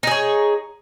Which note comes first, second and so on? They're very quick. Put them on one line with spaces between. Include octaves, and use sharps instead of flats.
D#4 G#4 C#5